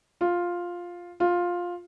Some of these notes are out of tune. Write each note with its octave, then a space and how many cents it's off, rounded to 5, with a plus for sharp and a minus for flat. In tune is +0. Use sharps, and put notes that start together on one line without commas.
F4 +5
F4 +10